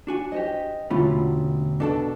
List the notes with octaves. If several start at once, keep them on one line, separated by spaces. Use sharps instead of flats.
D4 F#4 G#5
G4 C5 D#5
E1 D3 A3 C#4 F4 B5
B2 D4 A4 A5